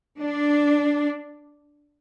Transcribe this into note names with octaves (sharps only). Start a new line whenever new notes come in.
D4